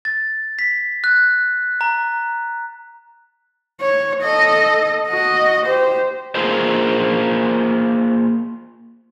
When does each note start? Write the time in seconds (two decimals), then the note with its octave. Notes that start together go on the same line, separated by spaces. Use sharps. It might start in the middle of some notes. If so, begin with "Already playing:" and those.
0.05 A6
0.59 B6
1.04 F#6
1.81 A#5
3.81 C#5
4.22 A4 D#5
5.08 F#4 D#5
5.66 G4 C5
6.35 A#3 F4 G#4 C5